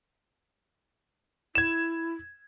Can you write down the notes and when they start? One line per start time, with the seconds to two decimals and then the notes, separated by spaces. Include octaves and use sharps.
1.55 E4 G#6 E7